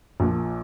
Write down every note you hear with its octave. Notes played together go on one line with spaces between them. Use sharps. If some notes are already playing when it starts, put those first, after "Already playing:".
A#1 A#2 F3